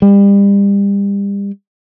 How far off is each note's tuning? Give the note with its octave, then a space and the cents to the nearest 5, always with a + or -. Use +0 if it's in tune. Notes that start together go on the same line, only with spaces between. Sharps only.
G3 +35